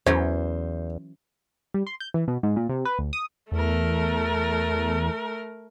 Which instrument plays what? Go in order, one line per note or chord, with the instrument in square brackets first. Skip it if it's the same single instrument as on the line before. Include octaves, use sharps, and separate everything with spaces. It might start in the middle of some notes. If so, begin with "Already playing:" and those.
[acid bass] E2 [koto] E3 F#3 C#4 [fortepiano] C5
[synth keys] G3
C6
G6
E3
B2
G#2
A#2
C3
B4
D2
D#6
[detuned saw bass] E2 [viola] A3 A#4